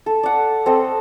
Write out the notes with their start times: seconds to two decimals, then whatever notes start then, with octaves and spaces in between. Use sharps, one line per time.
0.06 A4
0.23 D5 F#5
0.66 C4 A4 D#5